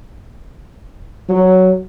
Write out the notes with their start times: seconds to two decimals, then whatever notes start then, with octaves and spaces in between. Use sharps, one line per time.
1.29 F#3